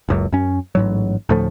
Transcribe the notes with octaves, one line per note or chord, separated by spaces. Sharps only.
F#1 C#2 F#2
F#2 C#4
A1 G#2 F#3
D2 A2 F3 A3